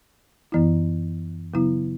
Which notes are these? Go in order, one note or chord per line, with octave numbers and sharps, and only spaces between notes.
F#2 E3 B3 E4
C#3 F#3 B3 E4